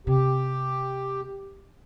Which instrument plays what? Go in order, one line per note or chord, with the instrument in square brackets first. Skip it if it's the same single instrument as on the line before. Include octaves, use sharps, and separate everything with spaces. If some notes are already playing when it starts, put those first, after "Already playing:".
[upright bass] C3 [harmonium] G4